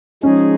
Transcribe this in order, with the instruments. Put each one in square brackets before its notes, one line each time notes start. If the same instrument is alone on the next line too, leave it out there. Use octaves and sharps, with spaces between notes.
[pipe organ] F3 G#3 D#4 G#4 [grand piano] C#4